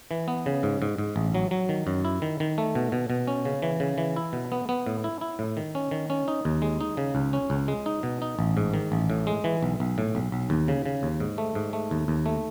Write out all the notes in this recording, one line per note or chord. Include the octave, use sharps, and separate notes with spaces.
E3
B3
C#3
G#2
G#2
G#2
A1
F#3
F#3
D#3
F#2
E4
D#3
D#3
A3
B2
B2
B2
C#4
C#3
E3
C#3
E3
E4
B2
B3
B3
A2
E4
E4
A2
D#3
C#4
D#3
C#4
D#4
D#2
G#3
D#4
C#3
C#2
C#4
C#2
G#3
D#4
B2
D#4
A1
G#2
D#3
A1
A2
G#3
E3
B1
B1
A2
B1
B1
D#2
C#3
C#3
D#2
G#2
A3
G#2
A3
D#2
D#2
A3